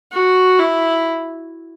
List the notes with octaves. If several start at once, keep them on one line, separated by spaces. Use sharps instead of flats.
F#4
E4